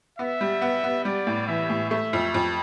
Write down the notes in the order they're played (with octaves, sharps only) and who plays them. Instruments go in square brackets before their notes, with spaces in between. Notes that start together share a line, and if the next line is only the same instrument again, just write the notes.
[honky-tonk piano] B3 [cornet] E5
[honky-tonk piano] G3
B3
B3
[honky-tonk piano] G3 [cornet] D5
[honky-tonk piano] A2
[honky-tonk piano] E3 [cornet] E5
[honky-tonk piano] A2
[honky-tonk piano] A3 [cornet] E5
[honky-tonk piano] F2
F2